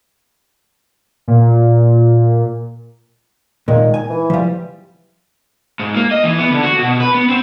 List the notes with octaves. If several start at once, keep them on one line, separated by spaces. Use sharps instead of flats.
A#2
A#2 D#3 G#3
G#5
E3
F3 G3
G#2
A#3
D#5
E3
B3
D3
F#4
B2
B4
B3
C4